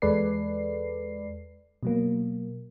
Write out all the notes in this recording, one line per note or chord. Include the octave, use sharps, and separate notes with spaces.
E2 G#3 A4 B4 D5 C7
B2 F#3 A#3